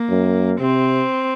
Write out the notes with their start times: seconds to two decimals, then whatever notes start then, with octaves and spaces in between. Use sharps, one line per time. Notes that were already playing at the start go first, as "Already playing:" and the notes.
Already playing: A#3
0.10 F#2
0.60 C3 C4